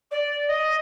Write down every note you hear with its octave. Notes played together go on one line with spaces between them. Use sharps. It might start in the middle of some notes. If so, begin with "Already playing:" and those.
D5
D#5